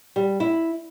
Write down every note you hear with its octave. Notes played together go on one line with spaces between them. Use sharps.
G3
E4